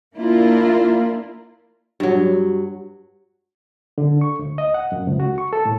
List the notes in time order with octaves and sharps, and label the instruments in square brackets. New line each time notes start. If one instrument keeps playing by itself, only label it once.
[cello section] A#3 D4 E4 F4 A#4
[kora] G2 F#3
[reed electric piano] D3
C#6
D2
D#5
F#5
F#2
C#2
F#4
C#6
A4
A2